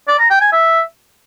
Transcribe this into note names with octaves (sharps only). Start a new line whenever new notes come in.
D5
A#5
G5
G#5
E5